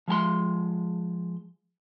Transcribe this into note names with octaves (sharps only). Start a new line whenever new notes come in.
F3 G#3 G#5 C6